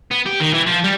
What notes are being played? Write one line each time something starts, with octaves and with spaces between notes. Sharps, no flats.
B3
G4
D#3
E3
F3
G3